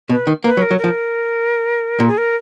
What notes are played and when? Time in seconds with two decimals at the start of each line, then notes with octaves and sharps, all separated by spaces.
0.09 B2 B4
0.27 D#3
0.44 A#3 B4
0.57 F#3
0.62 A#4
0.71 F#3
0.78 A#4
0.84 F3
2.00 A#2
2.08 G#4
2.18 A#4